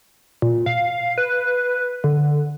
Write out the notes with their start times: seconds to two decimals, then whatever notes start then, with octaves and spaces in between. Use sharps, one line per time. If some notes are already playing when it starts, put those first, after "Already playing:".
0.42 A#2
0.66 F5
1.18 B4
2.04 D3